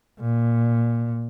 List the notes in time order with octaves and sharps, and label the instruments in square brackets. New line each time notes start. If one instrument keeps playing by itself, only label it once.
[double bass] A#2